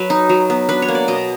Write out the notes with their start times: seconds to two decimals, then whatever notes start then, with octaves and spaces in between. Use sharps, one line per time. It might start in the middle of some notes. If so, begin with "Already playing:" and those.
Already playing: F#3 B4
0.10 D#4
0.29 F#3
0.50 B3
0.69 D4 B4
0.82 C#5
0.88 A#3
0.95 D5
1.08 B2 D#5